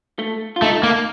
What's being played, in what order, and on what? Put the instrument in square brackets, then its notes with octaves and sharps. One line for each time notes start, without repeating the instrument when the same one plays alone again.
[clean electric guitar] A3
F4
[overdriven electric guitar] A3 [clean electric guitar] D#4
[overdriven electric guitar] A#3